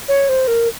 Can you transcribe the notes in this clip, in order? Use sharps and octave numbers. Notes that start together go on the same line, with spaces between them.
C#5
C5
A#4